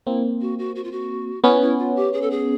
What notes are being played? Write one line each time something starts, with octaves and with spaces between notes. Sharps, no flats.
A#3 C4 E4
F#4
F#4
F#4
F4
F#4
B3 C#4 E4
E4
F4
G4
G#4
A4
G#4